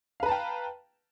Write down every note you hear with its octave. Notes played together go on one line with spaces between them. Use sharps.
B4 F5 G5 A5 A#5